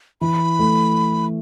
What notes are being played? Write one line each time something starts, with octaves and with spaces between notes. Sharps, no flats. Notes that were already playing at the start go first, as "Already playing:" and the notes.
E3 B5
A3